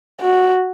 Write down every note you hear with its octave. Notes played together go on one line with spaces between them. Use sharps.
F#4